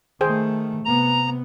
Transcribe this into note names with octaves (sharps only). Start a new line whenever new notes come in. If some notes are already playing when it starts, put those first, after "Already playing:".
D#3 A3 G#4 C5 G5
C3 B3 A#5